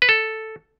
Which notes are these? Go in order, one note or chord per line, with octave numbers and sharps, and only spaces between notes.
B4
A4